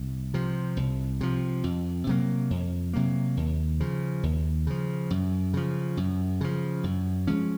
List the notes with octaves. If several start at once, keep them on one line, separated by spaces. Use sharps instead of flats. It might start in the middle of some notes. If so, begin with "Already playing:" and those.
Already playing: C2
C3 F3
C2
C3 F3
F2
C3 F#3 A#3
F2
C3 F#3 A#3
D#2
C#3 F3
D#2
C#3 F3
F#2
C#3 F3
F#2
C#3 F3
F#2
F3 G#3 C#4